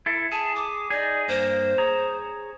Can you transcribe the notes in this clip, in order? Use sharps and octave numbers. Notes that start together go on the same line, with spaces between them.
E4 A4
G#4 A5
D6
D#4 G#4 D5
G2 A#3 C5
G#4 C#5 A#5